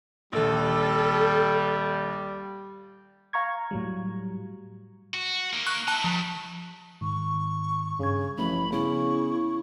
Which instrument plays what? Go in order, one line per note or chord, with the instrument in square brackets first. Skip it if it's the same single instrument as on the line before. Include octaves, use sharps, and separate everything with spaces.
[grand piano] A#1 D#2 [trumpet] G3 [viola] A4
[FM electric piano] F5 A#5 C#6 G#6
A2 F#3 G3
[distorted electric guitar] F#4
A#3 D#4
[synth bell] C#6 F#6
[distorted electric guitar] D#4 E4 [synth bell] A5 F#6
[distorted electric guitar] E3 G3 [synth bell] F3
[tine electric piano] G#2 D#3 [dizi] C#6
[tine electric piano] G2 G#6 [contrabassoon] C#3
[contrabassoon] A1 [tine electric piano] F3 G3 A3 [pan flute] B5
[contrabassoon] C#3 [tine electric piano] B3 [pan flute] E4 [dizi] C#6